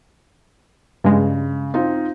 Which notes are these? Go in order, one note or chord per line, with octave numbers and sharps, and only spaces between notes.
G2 C#3 G#3
C4 D#4 F4